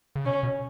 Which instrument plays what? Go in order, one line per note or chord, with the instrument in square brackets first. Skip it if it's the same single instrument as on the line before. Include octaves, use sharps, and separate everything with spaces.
[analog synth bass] C#3
[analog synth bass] B2 [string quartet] C#4
[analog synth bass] B2